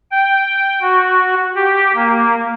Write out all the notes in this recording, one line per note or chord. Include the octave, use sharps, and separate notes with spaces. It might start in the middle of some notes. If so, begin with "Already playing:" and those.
G5
F#4
G4
A#3